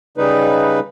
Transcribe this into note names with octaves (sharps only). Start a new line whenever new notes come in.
C#3 G3 D#4 B4